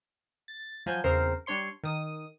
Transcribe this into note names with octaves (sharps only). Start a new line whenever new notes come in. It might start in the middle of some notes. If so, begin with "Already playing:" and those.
A6
F3 F#3 G#5 G6
E2 C#3 C4 A#4 C5 C7
G3 D4 C#5 C6 C#7
D#3 D#6 D#7